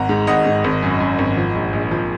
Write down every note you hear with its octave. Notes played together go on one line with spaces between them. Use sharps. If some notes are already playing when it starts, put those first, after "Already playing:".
Already playing: G#1 F#5 A#5
G#2
G#1 D#5 F#5
G#2
G#1
F#2
F#2
G#1
F3
A#1
A#1
F3